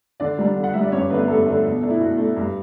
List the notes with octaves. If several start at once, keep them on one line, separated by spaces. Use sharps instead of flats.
D3 D4 D5
G3 D4
D3
F#5
G3 D4 E5
D5
G2 C#4 C#5
D3 A3 B3 D4 B4
G2 A3 A4
D3 A3 D4
B2
A3 D4
E4
B2 F#4
A3 D4
G2